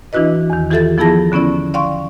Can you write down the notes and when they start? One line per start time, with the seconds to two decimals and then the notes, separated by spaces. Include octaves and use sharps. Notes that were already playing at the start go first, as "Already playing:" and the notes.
0.13 E3 D4 E4 F#4 B4 D#5
0.50 E2 D#3
0.70 E3 F4 G4 A4 E5 A6
0.98 F3 B3 E4 G#4 A5 A#6
1.32 D3 B3 C#4 E4 D5
1.74 D5 F5 G5 C6 C#6